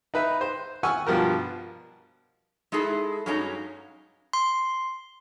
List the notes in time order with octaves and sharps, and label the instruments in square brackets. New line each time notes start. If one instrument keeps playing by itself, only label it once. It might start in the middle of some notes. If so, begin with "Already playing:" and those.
[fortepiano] D#4 B4 E5
C5
F#5 G#5 C#6 E6 F6
G2 B2 F3 G4 A#4
[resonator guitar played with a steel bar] G#3 D#4 E4 G#4 A4
G2 F#3 G#3 C#4 D#4 A#5
[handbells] C6